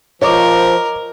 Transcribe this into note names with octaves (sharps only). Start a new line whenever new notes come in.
F3 A#4 C#5 D#5 D6